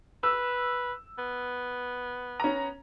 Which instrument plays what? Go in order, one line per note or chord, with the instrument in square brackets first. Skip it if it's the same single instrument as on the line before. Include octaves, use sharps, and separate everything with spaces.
[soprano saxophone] B4 [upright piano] E6
[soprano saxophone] B3
[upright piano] C#4 A#5